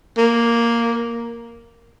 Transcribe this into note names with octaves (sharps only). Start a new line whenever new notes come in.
A#3